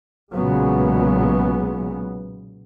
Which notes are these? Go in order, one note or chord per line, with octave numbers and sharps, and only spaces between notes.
B1 A#2 C#3 F#3 G#3 B3